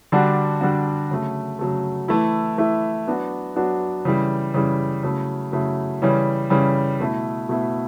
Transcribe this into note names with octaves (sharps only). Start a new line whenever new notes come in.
D3 G3 D4 F#4
D3 G3 D4 F#4
C#3 F#3 A3
C#3 F#3 A3
E3 A3 E4
E3 A3 E4
F#3 B3 D4 F#4
F#3 B3 D4 F#4
C#3 E3 G3
C#3 E3 G3
C#3 F#3 A3 E4
C#3 F#3 A3 E4
C#3 E3 G3 C#4
C#3 E3 G3 C#4
B2 A3 E4
B2 A3 E4